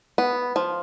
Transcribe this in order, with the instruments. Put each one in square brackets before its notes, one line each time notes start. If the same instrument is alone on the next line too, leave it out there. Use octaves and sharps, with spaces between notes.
[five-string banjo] B3
F3